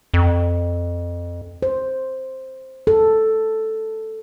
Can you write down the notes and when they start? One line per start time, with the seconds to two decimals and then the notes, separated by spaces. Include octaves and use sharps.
0.14 F2
1.63 C5
2.87 A4